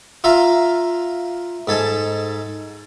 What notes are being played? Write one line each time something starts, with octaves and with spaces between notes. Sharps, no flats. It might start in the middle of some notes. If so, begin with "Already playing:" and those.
F4 E5 F5 A#5
G#2 A4 G#5 A5